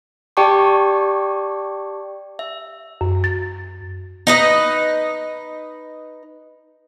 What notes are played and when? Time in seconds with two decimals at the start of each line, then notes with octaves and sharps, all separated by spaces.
0.37 G4 D5 G5 A5 C#6 D6
2.39 E5
3.01 F#2
3.24 A6
4.27 D#4 B4 D#5